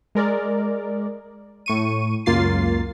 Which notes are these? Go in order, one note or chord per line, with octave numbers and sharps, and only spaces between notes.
G#3 A#4 D5
A2 C#6 D#7
C#2 F#2 A#3 F4 A6 C7